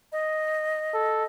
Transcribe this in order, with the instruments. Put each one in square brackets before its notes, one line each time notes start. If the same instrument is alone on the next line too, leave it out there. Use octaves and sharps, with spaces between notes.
[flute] D#5
[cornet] A4